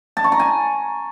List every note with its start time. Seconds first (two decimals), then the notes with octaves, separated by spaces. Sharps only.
0.17 A5
0.24 C#6
0.32 A#5
0.40 G#5